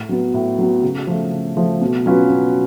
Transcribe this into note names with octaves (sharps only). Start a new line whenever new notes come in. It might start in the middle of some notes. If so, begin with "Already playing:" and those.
Already playing: A2
F#3 B3
A2
F#3 B3
C#3
F3 A3
C#3
F3 A3
B2
F#3 C#4 F4 B4
B2